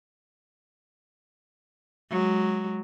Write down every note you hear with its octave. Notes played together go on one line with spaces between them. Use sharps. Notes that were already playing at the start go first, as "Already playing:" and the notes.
F#3 G#3